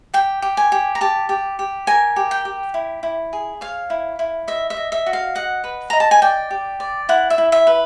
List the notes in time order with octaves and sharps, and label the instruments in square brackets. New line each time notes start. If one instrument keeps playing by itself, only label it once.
[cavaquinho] G4 G5
G4
G#5
G4
A#5
G4 A5
G4
G4
A#4 G#5
G4
G5
G4
E4
E4
G#4
C#5 F5
E4
E4
D#5 E5
E5
D#5
E5
F#4
F5
D#5 F#5
B4
D#5 A#5
A5
G#5
D5 G5
G4
D5
E4 F#5
E5
E4
E5
B4